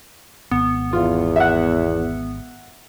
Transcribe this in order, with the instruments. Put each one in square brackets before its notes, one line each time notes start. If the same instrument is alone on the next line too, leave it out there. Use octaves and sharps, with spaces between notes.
[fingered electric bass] G#1 [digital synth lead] B3
[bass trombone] E2 [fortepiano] F4
[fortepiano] E5 F#5